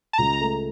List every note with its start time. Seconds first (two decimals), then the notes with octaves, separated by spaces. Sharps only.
0.13 A5
0.18 C#2 A#5
0.40 A3